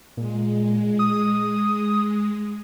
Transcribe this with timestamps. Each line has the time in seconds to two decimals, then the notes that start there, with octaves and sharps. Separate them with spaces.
0.17 A#2 G#3
0.99 D#6